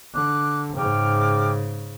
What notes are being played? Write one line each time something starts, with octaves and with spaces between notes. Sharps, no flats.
D3 D6 F#6
G#2 C#3 G5 D6 F6